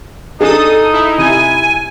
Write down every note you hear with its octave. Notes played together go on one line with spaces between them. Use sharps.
D4 D#4 G#4 A4 D#6
E4
C3 G#5